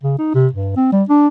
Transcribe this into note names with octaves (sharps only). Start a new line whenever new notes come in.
C#3
D#4
C3
G2
C4
G3
D4